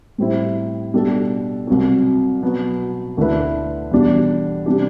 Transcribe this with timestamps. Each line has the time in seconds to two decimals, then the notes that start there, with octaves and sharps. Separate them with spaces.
0.18 A2 G3 C4 E4
0.93 B2 G3 D4 A4
1.67 C2 C3 F#3
2.42 B2 F#3 B3
3.17 D2 D3 A3 E4 B4
3.91 E2 B2 G3 D4 G4
4.66 C3 G3 D4 G4